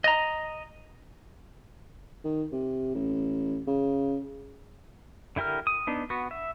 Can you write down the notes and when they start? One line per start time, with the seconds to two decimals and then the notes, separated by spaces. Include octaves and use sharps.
0.04 D#5 A#5
2.24 D#3
2.52 C3
2.94 A1
3.67 C#3
5.36 D3 E4 G4 A#4 F6
5.67 D#6
5.87 B3 D4 D#4
6.10 B3 F#4
6.31 E5